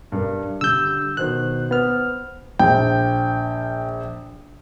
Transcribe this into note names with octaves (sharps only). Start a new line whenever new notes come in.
G2 A#4
D3 G3 E6 G6
B2 D#3 C5 F#6
B3 C5 F6
A#1 G5